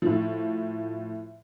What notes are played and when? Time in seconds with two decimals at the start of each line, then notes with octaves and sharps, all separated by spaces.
0.02 A2 F3